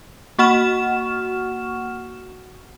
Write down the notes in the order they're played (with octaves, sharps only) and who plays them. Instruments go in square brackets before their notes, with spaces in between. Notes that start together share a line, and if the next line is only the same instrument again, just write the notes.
[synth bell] A#3 F#4 F#5 C#6 F6 E7